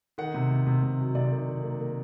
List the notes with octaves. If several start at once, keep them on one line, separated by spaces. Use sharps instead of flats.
D#3 F#5
C3
C3
C3
C3
F#3
C3 D5
D#3
D#3
A#3
A#3